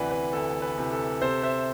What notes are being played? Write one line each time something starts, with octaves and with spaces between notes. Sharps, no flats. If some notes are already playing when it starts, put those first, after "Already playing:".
Already playing: D2 C3 E3 B4 D5 F#5
B4
D2 A4
B4
C3 E3
A4
C3 A4 C5
C5 E5